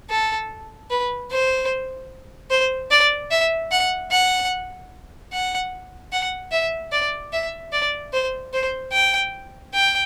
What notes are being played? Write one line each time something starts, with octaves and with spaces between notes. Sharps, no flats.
A4
B4
C5
C5
D5
E5
F#5
F#5
F#5
F#5
E5
D5
E5
D5
C5
C5
G5
G5